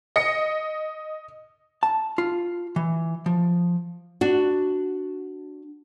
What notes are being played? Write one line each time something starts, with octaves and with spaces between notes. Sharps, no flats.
D#5 A#6 C#7
A5
F4
E3
F3
D4 F#4